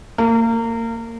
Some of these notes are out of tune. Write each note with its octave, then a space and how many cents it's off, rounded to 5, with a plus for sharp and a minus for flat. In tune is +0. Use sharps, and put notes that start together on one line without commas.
A#3 -30